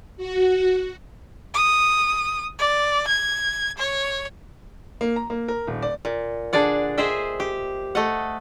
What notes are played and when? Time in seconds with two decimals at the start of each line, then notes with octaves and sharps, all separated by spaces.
0.17 F#4
1.54 D#6
2.59 D5
3.08 G#6
3.78 C#5
5.01 A#3
5.16 A#5
5.30 A#3
5.48 A#4
5.67 D#1
5.82 D5
6.05 A#2
6.53 D3 D4 G#4 D5 F#5
6.97 G#4 C5 D#5 E5 G5
7.40 G4
7.95 A3 D#5 F#5